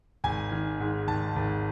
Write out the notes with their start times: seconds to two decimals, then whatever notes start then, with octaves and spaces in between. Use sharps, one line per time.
0.24 G#1 G#5
0.52 D#3
0.80 G#2
1.08 G#1 A5
1.36 G#1